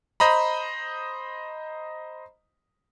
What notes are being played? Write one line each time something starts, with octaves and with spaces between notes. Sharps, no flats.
C5 D#5 A#5 B5